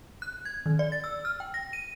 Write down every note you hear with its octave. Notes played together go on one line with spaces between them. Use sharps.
F#6
G#6
D#3
D5
A6
E6
F6
G5
A#6
D#7